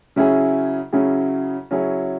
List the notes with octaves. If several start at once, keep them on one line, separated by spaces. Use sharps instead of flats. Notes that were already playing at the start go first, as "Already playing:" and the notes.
C#3 F#3 C#4 E4 G#4
C#3 F#3 C#4 E4 G#4
C#3 F#3 C#4 E4 G#4